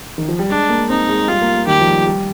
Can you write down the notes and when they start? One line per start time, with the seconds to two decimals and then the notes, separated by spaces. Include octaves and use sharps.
0.18 D#3
0.28 F3
0.39 G3
0.49 G#3 D4
0.69 A#3
0.90 C4 D#4
1.09 G#3
1.28 G3 F4
1.41 A#3
1.54 A#3
1.67 D#3 G4
1.81 F3
1.88 G3
2.07 G3